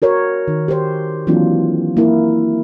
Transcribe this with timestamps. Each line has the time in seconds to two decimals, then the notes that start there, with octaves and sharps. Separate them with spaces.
0.02 F#4 A#4 C#5
0.48 D#3
0.68 G4 C5
1.27 E3 F#3 A#3 C4 D4 F4
1.97 A#3 E4 A#4